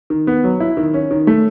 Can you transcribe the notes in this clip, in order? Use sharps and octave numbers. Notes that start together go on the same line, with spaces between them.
D#3
B3
F#3
E4
D#3
C#4
D#3
A3